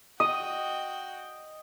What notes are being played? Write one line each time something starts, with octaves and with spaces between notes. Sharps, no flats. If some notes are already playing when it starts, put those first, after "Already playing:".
F#4 D#5 G5 D#6